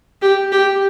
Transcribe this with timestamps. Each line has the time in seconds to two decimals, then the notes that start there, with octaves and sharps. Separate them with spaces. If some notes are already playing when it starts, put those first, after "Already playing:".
0.22 G4
0.52 G4